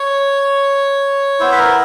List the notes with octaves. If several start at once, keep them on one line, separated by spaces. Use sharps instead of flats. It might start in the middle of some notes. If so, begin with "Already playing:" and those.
Already playing: C#5
B3 E4 C5
B4
A#4